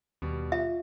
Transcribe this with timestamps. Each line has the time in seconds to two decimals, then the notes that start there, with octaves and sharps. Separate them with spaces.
0.22 D#2 B2 G3
0.52 F4 E5